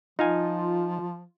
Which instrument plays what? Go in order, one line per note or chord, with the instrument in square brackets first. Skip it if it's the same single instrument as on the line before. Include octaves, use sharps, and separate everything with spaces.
[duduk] F3 [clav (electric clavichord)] D#4 F5 G#5 [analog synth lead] F4